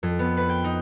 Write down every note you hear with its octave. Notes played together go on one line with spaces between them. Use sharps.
F2
B3
B4
G5
D#4